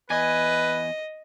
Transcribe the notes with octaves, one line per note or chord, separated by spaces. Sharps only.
E2 B4 D#5 G#5